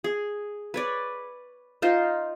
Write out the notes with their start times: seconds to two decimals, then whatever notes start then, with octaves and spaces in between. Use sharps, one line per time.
0.04 G#4
0.74 B4 C#5 D5
1.82 D#4 F4 C5